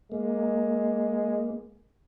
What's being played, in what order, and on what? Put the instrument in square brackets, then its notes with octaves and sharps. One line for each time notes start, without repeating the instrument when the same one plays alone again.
[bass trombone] G#3 [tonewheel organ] A#3